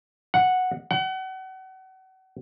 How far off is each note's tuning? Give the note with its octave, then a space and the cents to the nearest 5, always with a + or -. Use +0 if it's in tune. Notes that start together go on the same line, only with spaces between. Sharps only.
F#5 -5
F#5 +35